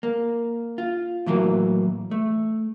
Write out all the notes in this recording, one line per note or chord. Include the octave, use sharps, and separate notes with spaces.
A#3
F4
A2 E3 F#3 A#3
A3